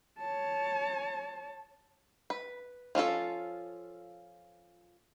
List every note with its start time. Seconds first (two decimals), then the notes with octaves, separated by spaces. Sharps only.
0.19 C#5 A5
2.30 B4
2.95 F3 C#4 F4 A4